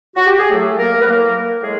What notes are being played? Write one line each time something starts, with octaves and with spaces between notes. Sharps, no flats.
F#4
G4
G#4
A2 F#3 A3 A4
A#3 A#4
B4
A2 F#3 A#3 A#4
A2 G#3 G#4